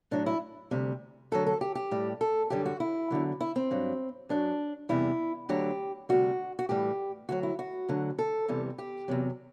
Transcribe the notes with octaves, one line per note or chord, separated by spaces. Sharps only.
A2 F#3 D4
E4
D2 C3 G3
D2 D3 F#3 A4
A4
G4
G4
A2 G3
A4
F#2 D3 G3 G4
F#4
E4
E2 D3 F#3
E4
C4
G2 F#3
F#2 F#3 D4
E2 C3 G3 E4
D2 D3 F#3 G4
D2 C3 G3 F#4
F#4
A2 E3 G3 G4
D2 D3 F#3 F#4
E4
F#4
D2 D3 F#3
A4
E2 C3 E3 G3
G4
E2 C3 F#3